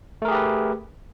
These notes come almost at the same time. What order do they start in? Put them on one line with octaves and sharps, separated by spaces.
A3 A#4 G#4 G4 B4